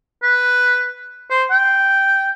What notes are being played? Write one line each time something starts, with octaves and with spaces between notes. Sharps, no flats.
B4
C5
G5